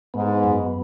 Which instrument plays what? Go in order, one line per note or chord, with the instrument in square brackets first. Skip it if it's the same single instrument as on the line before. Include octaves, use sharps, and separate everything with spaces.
[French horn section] G#2 [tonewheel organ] B3
[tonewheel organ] F#2